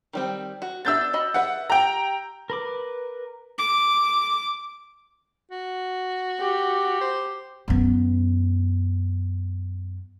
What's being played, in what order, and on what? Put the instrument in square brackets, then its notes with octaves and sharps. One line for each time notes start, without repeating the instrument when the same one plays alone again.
[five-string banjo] D#3 G3 C4
F#4
[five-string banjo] B3 D4 E5 [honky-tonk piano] E6 G6 A6
[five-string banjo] F#4 D#5 B5
[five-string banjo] G#4 B4 E5 [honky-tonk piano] F#5
[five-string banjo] G4 [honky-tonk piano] G5 A#5
[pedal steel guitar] A#4 B5 D6 [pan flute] B4
[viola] D6
[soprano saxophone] F#4
[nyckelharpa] G4
[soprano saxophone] C5
[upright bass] F#2 B3